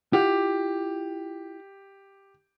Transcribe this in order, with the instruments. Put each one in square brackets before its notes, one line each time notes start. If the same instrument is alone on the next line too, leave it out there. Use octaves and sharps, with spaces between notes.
[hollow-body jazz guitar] E4 F4 F#5 [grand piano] G4